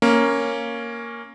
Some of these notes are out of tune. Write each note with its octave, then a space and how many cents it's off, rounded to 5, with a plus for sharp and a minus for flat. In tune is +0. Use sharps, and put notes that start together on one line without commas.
A#3 +0 C#4 +0